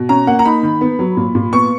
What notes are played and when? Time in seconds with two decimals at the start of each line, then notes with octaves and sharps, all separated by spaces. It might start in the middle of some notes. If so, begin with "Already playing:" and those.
Already playing: B2
0.09 C#4 A#5
0.27 A#3 F#5
0.39 A#5
0.45 D#4 B5
0.63 D#3
0.81 B3
0.99 F#3
1.17 A#2
1.35 A#2
1.53 B3 C#6